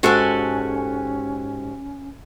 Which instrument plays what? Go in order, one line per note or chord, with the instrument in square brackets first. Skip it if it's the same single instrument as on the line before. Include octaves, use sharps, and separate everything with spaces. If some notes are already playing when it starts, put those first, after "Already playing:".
[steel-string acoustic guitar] G#2 G4 G#5 [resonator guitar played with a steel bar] G#3 F#4 A4 [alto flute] C#4